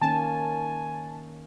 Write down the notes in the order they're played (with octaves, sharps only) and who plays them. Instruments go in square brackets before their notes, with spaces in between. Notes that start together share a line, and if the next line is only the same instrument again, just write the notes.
[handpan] D#3 A#3 C#4 [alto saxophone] G#5 [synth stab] A5